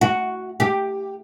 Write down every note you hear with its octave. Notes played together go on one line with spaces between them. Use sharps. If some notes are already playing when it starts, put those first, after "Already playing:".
F#4
G4